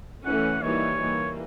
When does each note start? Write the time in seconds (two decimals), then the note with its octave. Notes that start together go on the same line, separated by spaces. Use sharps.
0.25 E3 A3 C#4 F#5
0.63 E3 G3 A#3 D#4 F#4 C#5
1.01 E3 G3 A#3